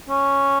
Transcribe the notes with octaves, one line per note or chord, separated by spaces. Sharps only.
C#4